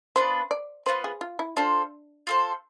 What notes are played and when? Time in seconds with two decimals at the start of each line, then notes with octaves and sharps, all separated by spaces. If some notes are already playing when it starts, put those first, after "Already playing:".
0.16 B3 D4 F4 B4 C5
0.51 D5
0.86 B3 D4 F4 B4 C5
1.04 G#4
1.21 F4
1.39 E4
1.56 D4 F4 A4 C5
2.27 F4 A4 C5